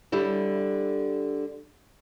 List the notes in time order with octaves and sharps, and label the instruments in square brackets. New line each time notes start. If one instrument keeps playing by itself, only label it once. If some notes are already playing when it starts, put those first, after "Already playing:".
[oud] D3 G3 E4